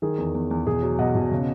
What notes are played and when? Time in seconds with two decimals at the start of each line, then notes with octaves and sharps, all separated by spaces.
0.02 D#3 G#4
0.18 E2
0.35 E2
0.51 E2
0.66 B2 G#4
0.83 F#3
0.98 B2 D#5 F#5
1.15 B2
1.31 C#3